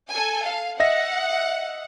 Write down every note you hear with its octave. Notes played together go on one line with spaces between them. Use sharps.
A4 G#5
F5
D#5 E5 F#5 A#6